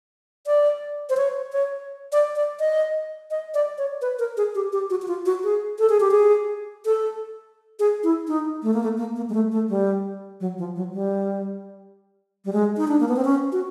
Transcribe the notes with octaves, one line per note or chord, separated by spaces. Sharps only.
D5
C5
C#5
C#5
D5
D5
D#5
D#5
D5
C#5
B4
A#4
G#4
G4
G4
F#4
F#4
F4
F#4
G#4
A4
G#4
G4
G#4
A4
G#4
E4
D#4
A3
A#3
A3
A#3
A#3
G#3
A3
A3
G3
F#3
F3
F#3
G3
G3
G#3
D#4
D4
A#3
B3
C4
C#4
F#4